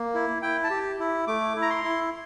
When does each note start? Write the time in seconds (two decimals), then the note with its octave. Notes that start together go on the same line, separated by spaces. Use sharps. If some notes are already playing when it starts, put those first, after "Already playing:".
Already playing: A#3
0.14 E4
0.42 E4 G5
0.64 A5
0.70 G4
0.99 E4
1.27 A3 D6
1.56 E4
1.62 A#5
1.70 C6
1.84 E4